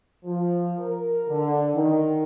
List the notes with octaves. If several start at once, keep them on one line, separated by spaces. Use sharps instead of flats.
F3
A#4
D3
D#3